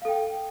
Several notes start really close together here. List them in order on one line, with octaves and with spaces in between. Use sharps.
F5 A4 G5